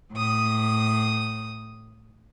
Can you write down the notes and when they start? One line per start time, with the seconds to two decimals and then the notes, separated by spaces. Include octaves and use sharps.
0.12 A2 D#6